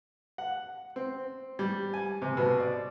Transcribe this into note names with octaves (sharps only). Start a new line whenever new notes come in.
F#5
C4
G3
G#5
C3
B2
D5